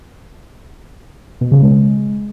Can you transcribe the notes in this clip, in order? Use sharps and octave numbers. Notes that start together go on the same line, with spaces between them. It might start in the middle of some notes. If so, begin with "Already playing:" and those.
B2
C#3
G#3